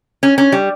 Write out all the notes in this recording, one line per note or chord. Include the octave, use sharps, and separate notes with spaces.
C#4
C#4
G3